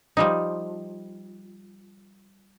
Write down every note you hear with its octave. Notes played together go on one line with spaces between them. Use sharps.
F3 G3 D#4